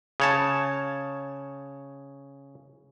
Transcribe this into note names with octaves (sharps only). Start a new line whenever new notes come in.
C#3 C#5 A5